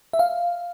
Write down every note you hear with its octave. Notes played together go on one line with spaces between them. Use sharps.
E5
F5